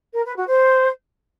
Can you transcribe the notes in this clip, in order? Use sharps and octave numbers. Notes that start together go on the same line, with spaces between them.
A#4
B4
F#4
C5